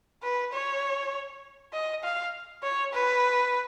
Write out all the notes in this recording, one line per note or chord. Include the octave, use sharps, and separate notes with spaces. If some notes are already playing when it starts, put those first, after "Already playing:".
B4
C#5
D#5
F5
C#5
B4